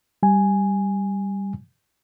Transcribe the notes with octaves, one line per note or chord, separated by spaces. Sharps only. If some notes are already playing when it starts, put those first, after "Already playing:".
G3 G#5